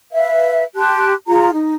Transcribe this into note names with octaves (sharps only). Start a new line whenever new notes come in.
B4 E5 F5
G4 A5 C6 F#6
F4 G#4 A#5
D#4